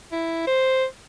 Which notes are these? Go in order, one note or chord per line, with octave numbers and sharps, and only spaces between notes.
E4
C5